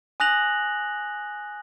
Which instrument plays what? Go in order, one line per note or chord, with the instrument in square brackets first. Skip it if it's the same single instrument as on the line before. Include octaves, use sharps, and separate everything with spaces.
[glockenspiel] G#5 D#6 F#6 A#6 F7 F#7